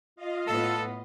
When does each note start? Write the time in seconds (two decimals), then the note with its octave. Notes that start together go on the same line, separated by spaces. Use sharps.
0.16 F4 D#5 F5
0.48 A2 B3 A4